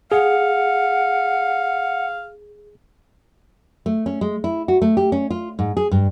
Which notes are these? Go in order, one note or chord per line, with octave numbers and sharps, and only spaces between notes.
G#4 F5 F#5
A3
C#4
G#3
E4
F#4
A3
G4
C#4
F4
G#2
G#4
G2